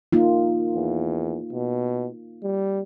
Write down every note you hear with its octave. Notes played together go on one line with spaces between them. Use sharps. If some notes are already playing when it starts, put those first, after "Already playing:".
A#3 D#4 F4
E2
B2
G3